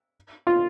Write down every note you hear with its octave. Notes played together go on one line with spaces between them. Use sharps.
F4